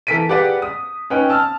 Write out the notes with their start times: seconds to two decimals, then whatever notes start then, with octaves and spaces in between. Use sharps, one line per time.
0.07 E3 A4 A#4 B6 D7 D#7
0.29 G4 G#4 B4 D5 F#5
0.62 D#6
1.10 C#4 D#4 B4 G5
1.30 A5 E6 F6